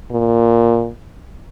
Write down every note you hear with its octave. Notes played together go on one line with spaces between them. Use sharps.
A#2